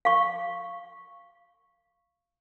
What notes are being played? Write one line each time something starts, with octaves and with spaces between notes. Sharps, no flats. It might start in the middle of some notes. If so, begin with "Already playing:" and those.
F5 C#6